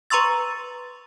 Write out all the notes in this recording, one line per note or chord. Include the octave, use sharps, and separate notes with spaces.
B4 A#5 C6 C#6 E6 A6